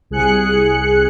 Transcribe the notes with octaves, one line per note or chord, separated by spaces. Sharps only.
C2 G#4 F#6 C#7